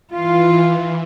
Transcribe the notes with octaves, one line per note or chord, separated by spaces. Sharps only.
E3 F4